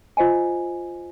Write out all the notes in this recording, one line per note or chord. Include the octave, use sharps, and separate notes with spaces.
F4 C5 D#5 G#5